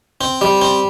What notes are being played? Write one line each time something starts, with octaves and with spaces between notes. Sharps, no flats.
C4
G3
C4